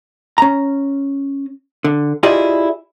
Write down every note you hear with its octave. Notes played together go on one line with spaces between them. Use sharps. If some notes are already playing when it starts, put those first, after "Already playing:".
C#4 A#5
D3
E4 F4 G4 G#4 D5 D#5